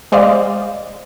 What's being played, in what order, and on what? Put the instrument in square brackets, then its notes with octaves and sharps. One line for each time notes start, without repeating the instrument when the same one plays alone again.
[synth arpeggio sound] G#3 C5 D5 D#5 F5